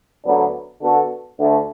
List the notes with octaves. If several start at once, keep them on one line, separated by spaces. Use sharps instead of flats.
D2 D3 F#3 B3 D4
D3 B3 F#4 A4
D2 D3 A3